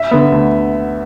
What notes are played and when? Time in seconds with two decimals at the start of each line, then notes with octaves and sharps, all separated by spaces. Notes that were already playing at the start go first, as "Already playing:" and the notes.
Already playing: E5
0.11 D3 B3
0.32 D2